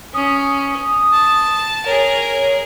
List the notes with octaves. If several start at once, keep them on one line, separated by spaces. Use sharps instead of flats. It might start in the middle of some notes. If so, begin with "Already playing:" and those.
C#4 D#6
A5
G#4 A#4 C#5